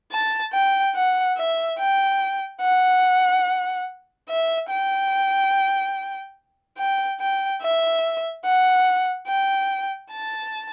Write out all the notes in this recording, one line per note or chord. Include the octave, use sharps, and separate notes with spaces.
A5
G5
F#5
E5
G5
F#5
E5
G5
G5
G5
E5
F#5
G5
A5